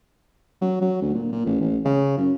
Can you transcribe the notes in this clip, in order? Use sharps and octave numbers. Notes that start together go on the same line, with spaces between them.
F#3
F#3
D2
A#2
A#2
A1
A1
C#3
F#2